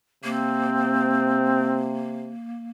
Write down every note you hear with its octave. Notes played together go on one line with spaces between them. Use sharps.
C3 A#3 C4